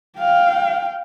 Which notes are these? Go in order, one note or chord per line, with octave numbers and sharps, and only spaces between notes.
F5 G5